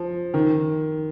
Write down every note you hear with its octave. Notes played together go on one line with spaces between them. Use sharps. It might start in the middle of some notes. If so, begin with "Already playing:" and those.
Already playing: F3
D#3